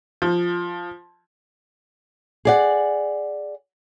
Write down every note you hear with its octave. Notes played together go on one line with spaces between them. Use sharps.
F3
G#4 D5 F#5